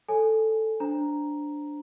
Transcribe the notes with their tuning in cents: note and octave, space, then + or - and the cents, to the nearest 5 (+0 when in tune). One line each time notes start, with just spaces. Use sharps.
A4 +0 C#5 -5 G#5 +0
D4 +0 C5 +0 A#5 +0